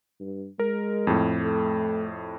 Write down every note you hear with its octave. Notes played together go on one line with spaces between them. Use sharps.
G2
G#3 A#4
F2 A2
A3